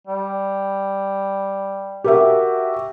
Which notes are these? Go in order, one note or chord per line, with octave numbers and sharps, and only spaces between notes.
G3
F#4 G4 A#4 E5